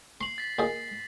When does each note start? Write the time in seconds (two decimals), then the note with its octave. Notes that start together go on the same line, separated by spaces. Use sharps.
0.21 C6 C7 F#7
0.38 A6 B6
0.59 A#2 D#4 G#4